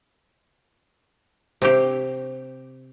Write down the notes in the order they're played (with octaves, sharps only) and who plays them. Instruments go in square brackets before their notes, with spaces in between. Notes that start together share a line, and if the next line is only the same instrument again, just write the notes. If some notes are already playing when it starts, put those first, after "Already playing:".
[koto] C3 C4 G4